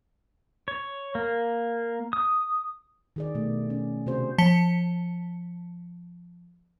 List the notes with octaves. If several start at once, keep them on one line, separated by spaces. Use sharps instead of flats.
C#5
A#3
D#6
D#3 G#4 D5
B2 A3
C#4
C3 C4 F#4 G#4 C5
F3 A5 B6 C#7 G7